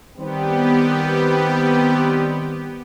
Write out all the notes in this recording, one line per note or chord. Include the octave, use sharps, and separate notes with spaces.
D#3 G3 B3 C4 G4